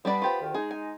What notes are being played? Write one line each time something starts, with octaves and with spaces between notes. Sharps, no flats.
G3 B3 D4 D5 B5
F4 G4 C5
D2 D#3
G#3 D#4 G#4
G#5